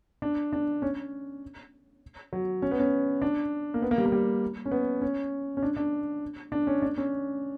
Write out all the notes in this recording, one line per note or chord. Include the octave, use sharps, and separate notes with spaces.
D4
D4
C#4
F#3
C#4
B3
C#4
D4
A#3
B3
A#3
G3
A#3
G3
C#4
B3
C#4
C#4
D4
D4
D4
C#4
D4
C#4